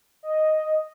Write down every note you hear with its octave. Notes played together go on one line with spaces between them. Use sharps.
D#5